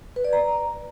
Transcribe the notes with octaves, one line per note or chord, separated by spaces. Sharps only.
B4
D5
A#5